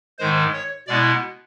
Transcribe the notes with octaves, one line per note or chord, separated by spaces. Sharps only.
G#2 D#3 G#3 C5
C#5
B2 G#3 B3 E4 D5